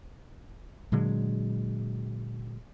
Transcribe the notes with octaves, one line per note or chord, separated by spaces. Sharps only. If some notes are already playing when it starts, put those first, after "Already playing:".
A#2 D3 F#3 G#3